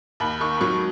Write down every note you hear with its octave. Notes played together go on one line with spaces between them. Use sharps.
D#2 B5
D#3 C#6
B5
F#3 C#6